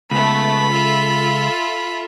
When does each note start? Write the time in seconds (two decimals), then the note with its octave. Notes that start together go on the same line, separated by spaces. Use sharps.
0.11 C#2 A3 B3 B5
0.71 F4 A4 E5